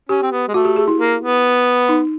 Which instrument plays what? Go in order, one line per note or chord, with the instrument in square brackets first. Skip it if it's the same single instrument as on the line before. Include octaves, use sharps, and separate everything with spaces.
[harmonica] C#4 [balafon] G4
[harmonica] C4
B3
G#3
[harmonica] A3 [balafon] F#4
[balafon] G4
G#4
E4
[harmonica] A#3
B3
[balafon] D#4